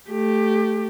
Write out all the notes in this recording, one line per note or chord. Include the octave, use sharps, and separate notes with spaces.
A3 G4